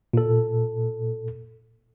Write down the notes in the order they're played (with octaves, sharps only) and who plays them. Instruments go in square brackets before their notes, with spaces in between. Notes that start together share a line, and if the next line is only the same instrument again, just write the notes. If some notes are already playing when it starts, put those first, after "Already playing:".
[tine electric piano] A#2 A4